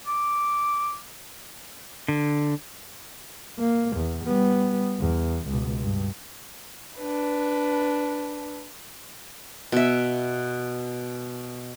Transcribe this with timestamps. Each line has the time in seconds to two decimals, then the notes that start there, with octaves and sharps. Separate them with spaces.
0.07 D6
2.08 D3
3.59 A#3
3.96 E2
4.25 G3 B3
4.99 E2
5.48 C#2 B2
5.81 G2
6.99 D4 B4
9.72 B2 E5